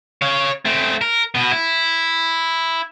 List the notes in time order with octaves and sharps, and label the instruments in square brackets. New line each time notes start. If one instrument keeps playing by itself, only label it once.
[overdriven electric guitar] C#5 F5
A3 C4
A#4
B2 B3
E4